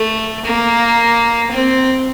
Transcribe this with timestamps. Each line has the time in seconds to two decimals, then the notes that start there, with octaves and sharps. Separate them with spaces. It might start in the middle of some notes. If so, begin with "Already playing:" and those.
Already playing: A3
0.44 A#3
1.51 C4